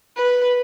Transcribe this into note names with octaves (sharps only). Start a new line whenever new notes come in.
B4